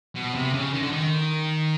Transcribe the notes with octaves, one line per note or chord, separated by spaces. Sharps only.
B2
C3
C#3
D#3
D3
D#3